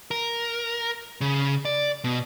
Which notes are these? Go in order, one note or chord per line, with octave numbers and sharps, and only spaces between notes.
A#4
C#3
D5
B2